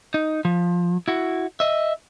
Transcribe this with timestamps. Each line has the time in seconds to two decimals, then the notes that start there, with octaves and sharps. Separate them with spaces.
0.14 D#4
0.45 F3
1.08 E4 F#4
1.60 D#5 E5